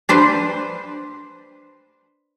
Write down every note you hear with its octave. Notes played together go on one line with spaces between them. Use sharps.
D4 B4 C5